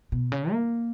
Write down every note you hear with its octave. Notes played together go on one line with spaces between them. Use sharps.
B2
C#3
A#3